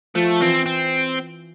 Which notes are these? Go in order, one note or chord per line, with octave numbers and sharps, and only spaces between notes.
F3 A3
E3 C4
C4